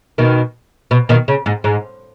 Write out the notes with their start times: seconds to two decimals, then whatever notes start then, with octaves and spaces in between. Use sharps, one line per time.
0.18 B2 D#3
0.91 B2
1.09 B2 D#3
1.28 C#3
1.46 G#2
1.64 G#2